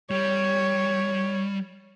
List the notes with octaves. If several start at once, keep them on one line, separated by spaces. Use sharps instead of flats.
G3 C#5